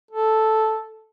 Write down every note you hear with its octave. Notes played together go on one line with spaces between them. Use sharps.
A4